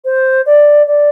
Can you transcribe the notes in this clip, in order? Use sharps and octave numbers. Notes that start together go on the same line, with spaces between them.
C5
D5
D5